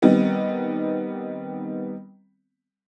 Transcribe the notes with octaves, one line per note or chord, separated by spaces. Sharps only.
D#3 G3 B3 C4